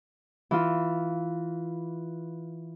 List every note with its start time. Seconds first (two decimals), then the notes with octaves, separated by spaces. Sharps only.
0.51 E3 F4